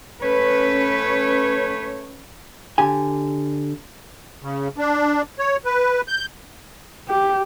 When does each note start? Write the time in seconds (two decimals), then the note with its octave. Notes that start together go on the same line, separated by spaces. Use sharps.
0.22 A3 C#4 B4 C#5
2.78 D3 G4 G#5
4.42 C#3
4.78 D4
5.39 C#5
5.65 B4
6.08 G6
7.08 G4